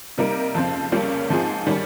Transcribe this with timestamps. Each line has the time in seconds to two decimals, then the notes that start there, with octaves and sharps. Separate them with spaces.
0.18 C3 G3 A#3 D#4 A#4
0.55 F2 C#3 F3 C4
0.92 C#2 C#3 G3 A#3 C#4
1.29 G#2 F3 C4 F4 G#4
1.67 D#3 G3 C#4